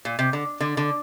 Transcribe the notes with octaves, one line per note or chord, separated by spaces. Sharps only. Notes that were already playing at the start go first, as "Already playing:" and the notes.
A#2
C3
D3
D3
D3